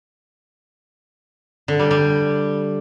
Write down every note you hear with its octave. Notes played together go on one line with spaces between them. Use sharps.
D3
G3
G3